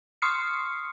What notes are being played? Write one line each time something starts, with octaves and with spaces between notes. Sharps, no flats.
C6 C#6 D#6 F6 C7 C#7